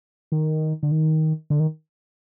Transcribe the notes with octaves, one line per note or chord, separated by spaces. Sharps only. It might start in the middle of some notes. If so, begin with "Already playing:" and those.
D#3
D3
D#3
D3
D#3